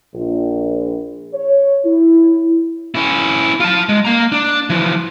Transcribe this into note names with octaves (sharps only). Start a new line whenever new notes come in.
A#1
C#5
E4
C#4 E4
F4 A5
G#3
A#3 A#5
D4
E3 F3